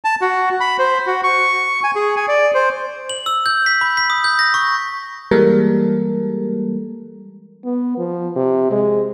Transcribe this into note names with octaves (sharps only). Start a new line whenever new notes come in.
A5
F#4
B5
C5
F#4
C#6
G#5
G#4
G#5
D5
C5
F#7
E6
G6
B6
B5
B6
D#6
G6
A#6
C#6
E3 G3 G#3 A#3 A4 A#4
B3
F3
C3
G#3